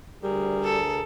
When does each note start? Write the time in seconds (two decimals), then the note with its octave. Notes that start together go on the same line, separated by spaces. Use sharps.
0.23 D2 G3 G#4 A#4
0.64 A4